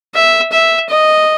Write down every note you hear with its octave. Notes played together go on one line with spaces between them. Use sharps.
E5
E5
D#5